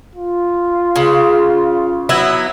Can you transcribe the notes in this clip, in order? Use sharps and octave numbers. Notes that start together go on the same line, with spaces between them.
F4
C#3
F#3 B3 E4